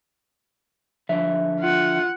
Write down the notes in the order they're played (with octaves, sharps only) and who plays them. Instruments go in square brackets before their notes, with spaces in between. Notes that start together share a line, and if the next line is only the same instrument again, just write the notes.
[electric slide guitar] D3 F3 E5
[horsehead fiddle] F4 F#5